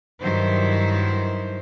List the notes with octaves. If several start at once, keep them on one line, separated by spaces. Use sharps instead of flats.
G2 D#3 F#3 E4 C5